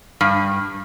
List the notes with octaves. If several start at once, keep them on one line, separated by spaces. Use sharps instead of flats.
G2